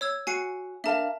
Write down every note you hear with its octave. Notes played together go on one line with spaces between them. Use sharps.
C#5 E6 G#6
F#4 G#5 C7 C#7
D4 A#4 E5 F5 A5